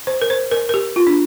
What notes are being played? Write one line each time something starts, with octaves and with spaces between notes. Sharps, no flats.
C5
A#4
C5
A#4
A#4
G4
F4
D4